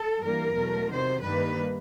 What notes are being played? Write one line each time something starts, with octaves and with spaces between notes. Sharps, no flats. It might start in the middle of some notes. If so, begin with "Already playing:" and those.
Already playing: A4
G2 E3 G3 A#3 A#4
E2 B2 F#3 A3
C3 D#3 F#3 C5
G2 D#3 G3 A#3 B4